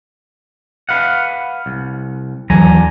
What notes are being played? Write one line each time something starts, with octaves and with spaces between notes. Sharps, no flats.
B4 F5 F#5
C2
D#2 D3 E3 F#3 G#5 A#5